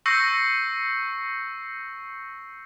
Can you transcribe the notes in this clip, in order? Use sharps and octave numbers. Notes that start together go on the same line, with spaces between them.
C#6 E6 G6 A#6 C7 C#7